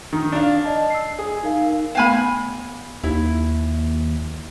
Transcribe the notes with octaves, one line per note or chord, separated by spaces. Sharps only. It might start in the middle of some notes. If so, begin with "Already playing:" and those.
D#3
D4 F5
D5 D#5 A5
E6 C7
G#4
D#4 A#4 F5
A3 B3 F5 G5 G#5 B5
D#2 E4